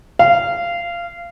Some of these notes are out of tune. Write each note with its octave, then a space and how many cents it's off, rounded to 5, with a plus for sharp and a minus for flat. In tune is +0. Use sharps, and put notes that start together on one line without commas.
F5 -20